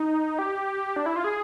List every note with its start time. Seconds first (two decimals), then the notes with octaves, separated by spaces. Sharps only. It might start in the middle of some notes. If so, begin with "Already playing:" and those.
Already playing: D#4
0.39 G4
0.96 D4
1.06 E4
1.16 F4
1.24 G#4